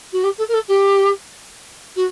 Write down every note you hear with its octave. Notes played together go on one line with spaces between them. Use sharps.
F#4
G4
A4
A#4
A4
G4
F#4